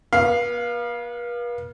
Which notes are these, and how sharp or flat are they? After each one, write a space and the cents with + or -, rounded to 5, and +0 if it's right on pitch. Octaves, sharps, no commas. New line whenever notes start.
B3 -45 F5 +0